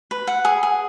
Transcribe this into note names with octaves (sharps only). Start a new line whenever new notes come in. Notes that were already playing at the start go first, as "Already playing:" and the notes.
B4
F#5
G#4
G#4